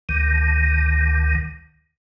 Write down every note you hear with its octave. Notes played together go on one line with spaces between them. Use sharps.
D2 D#3